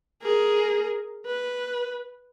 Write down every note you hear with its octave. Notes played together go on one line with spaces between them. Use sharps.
G#4 A#4
B4